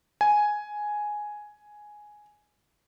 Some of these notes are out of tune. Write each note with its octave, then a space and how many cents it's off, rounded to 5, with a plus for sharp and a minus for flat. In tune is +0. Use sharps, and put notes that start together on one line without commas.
G#5 +5